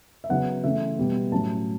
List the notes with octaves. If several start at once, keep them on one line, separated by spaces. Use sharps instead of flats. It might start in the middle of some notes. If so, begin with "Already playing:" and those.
E5
C#3 F#3 B3 F#5
C#3 E3 A3 C#4 E5
B2 G3 B3
A2 F#3 C#4 A5